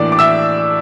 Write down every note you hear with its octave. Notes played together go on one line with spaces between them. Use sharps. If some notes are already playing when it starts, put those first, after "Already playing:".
Already playing: A2 E3 A#3 D4 D5 D6
D6
E5 E6